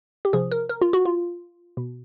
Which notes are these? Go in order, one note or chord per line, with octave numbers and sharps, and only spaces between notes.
G4
C3 F3 G#4
A#4
A#4
F4
F#4
F4
B2